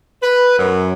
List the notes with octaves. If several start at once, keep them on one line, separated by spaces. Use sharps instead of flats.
B4
F#2